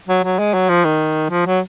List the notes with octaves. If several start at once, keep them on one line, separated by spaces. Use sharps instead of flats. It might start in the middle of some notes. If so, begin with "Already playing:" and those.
F#3
F#3
G#3
F#3
F3
D#3
F3
F#3